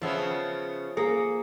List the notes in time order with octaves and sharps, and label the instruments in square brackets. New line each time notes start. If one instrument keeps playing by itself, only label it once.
[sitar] C#3 B3 C#4 [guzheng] F3 E5
[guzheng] A#3 [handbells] G#4